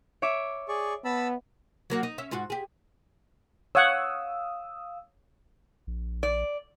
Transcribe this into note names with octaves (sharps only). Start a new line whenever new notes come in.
C#5 E5 D6
G#4 D5 C#6
B3 A5 B5 E6
F#3 A#3 F#4
D#4
C#4 E5
G#2 F4 F#4
G4 G#4
C#5 F5 F#5 D#6 E6
A#1
D5